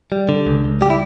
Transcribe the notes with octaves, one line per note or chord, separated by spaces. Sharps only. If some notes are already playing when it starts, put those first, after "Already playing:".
G3
D3
C#2
C#2
G3 G4
E4